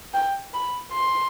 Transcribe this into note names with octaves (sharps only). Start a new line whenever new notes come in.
G5
B5
C6